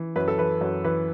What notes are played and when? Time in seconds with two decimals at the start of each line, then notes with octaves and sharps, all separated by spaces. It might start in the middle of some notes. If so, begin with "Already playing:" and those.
Already playing: E3
0.16 F#2 B4
0.28 A4
0.38 E3 B4
0.61 F#2
0.84 E3 B4